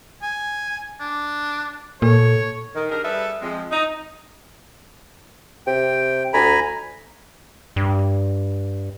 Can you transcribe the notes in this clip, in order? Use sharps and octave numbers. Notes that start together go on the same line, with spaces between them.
G#5
D4
A#2 A4 C#5
D#3
D4 G4 G#4 A#4
G3 G#4 A4 B4 D5 E5
F3 G#3 C4
D#4
C3 G5
D2 G#5 A#5 B5
G2